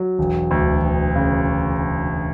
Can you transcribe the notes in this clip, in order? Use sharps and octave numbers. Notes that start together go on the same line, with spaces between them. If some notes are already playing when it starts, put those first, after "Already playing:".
Already playing: F#3
E1
D2
E1
C#3